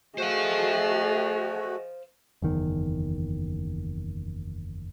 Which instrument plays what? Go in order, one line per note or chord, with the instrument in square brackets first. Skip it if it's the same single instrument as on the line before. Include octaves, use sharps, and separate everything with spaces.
[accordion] A3 F#4 [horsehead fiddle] G#4 D#5 [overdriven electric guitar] C5 F5
[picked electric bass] F#1 E2 D#3